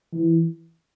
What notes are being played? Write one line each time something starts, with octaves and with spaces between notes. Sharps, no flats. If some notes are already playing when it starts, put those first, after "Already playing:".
E3